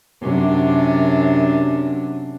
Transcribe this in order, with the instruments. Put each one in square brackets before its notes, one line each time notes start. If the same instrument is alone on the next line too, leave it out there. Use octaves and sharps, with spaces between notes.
[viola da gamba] F#2 C3 D4